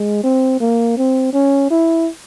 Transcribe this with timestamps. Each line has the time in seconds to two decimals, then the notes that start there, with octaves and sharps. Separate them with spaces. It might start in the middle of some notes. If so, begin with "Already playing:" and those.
Already playing: G#3
0.23 C4
0.60 A#3
0.97 C4
1.33 C#4
1.70 E4